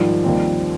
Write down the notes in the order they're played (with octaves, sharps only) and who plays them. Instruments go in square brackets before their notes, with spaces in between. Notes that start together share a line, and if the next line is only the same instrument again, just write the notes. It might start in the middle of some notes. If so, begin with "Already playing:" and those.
Already playing: [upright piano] G#2 D#3 G3 [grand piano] F3
[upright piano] D#2 D#3 G3 C4